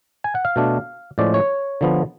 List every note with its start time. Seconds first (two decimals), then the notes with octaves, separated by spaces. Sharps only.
0.24 G#5
0.35 F#5
0.45 F5
0.56 B2 A3 D4
1.18 A2 F3 G#3 C#4 D5
1.34 C#5
1.81 D3 F3 B3